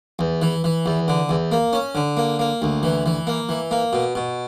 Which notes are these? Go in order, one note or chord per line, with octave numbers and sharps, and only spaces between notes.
E2
E3
E3
E2
D3
E2
A#3
C#4
D3
A#3
A#3
D2
E3
E3
A#3
E3
A#3
B2
B2